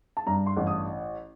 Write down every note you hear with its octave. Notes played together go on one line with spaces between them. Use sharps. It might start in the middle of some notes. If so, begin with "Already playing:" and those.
A5
G2 A#5
C6
A1
D#6